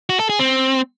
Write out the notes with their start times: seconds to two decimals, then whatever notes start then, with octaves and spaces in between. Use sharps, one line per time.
0.09 F#4
0.19 A4
0.29 G#4
0.39 C4